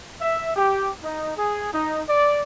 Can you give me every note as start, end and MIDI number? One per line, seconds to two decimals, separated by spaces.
0.21 0.50 76
0.56 0.91 67
1.03 1.33 63
1.37 1.70 68
1.74 2.01 63
2.09 2.42 74